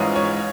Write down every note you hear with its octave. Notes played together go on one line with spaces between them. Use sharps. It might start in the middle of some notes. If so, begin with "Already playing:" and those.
Already playing: G#2 E3 G#3 C#4 F4
C#5